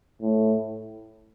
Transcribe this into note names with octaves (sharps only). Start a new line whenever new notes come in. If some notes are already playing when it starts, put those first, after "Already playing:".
A2